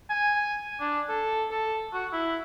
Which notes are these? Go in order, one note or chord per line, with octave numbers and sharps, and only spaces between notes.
G#5
D4
A4
A4
F#4
E4